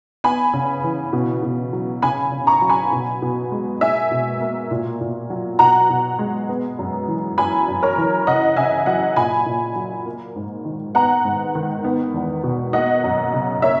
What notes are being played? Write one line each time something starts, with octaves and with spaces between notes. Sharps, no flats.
B3 G#5 B5
C#3
E3
B2
B2
F#3
C#3 G#5 B5
C#3
A#5 C#6
F#3
G#5 B5
B2
B2
G#3
A#3 E5 G#5
B2
A#3
A#2
A#2
F#3
B2 F#5 A#5
B2
G#3
B3
F#2
E3
F#2 G#5 B5
F#2
A#4 C#5
E3
C#3 D#5 F#5
C#3 E5 G#5
F#3 D#5 F#5
A#2 G#5 B5
A#2
F#3
A#3
G#2
D#3
B3 F#5 A#5
G#2
D#3
B3
E2
B2
A#3 D#5 F#5
F#2
C#3
A#3 C#5 E5